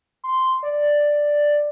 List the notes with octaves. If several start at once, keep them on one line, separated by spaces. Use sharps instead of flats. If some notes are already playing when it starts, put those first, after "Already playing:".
C6
D5